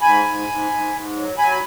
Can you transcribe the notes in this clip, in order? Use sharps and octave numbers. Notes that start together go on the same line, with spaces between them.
G#2 G#5 B5
G#2
G#2
G#2
G#2
F#3
F#3 G#5 B5
B5